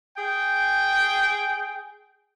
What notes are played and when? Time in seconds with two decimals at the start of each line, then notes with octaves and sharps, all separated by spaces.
0.17 G#4 G5